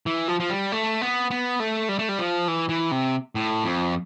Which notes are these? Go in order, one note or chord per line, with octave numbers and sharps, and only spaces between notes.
E3
F3
F3
G3
A3
B3
B3
A3
G3
A3
G3
F3
E3
E3
C3
A2
F2